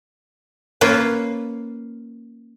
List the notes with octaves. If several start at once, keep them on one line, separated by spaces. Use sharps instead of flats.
A#3 C#4 F4 B4